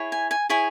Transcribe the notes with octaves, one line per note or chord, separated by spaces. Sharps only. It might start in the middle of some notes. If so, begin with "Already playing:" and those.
Already playing: E4 G#4 C#5
G#5
G#5
E4 G#4 C#5 G#5